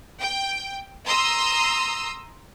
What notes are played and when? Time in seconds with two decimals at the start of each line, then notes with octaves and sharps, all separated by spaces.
0.20 G5
1.07 A#5 C6 D#6 E6